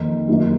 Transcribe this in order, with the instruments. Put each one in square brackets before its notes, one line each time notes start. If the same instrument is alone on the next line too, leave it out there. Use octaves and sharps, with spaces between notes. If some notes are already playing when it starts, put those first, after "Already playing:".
Already playing: [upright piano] F2 D#3 A#3 D#4
F#2 D#3 A#3 D#4